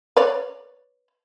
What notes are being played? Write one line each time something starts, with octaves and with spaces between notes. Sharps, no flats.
B4 C#5 D5